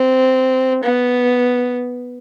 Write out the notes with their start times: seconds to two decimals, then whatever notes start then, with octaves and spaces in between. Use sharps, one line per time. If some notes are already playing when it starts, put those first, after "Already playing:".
Already playing: C4
0.84 B3